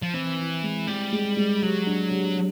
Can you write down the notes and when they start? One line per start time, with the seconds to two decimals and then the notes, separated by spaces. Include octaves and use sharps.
0.02 F3
0.14 E3 C4
0.38 E4
0.63 G#3
0.87 G3 G#3
1.13 G#3
1.37 G#3
1.62 F#3 G4
1.87 D4
2.11 G4
2.36 G4